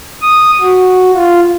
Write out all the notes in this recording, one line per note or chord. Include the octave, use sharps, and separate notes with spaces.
D#6
F#4
F4